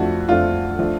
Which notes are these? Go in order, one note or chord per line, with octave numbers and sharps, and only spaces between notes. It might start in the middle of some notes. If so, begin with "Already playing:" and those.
Already playing: F2 F3 A3 D4 F#4
F2 F3 A3 D4 F4
F3 A3 D4